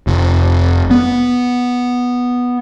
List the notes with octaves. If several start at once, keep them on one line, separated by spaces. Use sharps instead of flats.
F1
B3